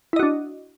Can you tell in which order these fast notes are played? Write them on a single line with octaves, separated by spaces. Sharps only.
E4 D#5 F#4 D4